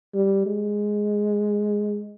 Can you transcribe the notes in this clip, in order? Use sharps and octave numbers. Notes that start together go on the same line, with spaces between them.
G3
G#3